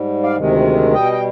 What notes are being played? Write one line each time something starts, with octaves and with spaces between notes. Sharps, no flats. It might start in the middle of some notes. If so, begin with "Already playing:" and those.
Already playing: G#2 G3
D5 F5
D2 C3 D#3 G#3
B2 G3 D#5 G5
G5